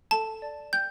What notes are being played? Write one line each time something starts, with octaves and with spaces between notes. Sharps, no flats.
A4 A5
D5
G5 G6